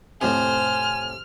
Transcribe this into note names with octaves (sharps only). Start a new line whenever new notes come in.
F2 A2 C3 C5 G#5 F6